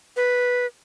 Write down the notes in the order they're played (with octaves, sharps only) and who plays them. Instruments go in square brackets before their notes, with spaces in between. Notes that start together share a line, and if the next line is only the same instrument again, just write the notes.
[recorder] B4